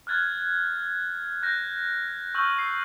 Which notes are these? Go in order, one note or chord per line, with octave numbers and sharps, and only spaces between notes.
F6 F#6 G#6 A6
F#6 G6 A#6
C#6 E6 F6 G6 F#7
C7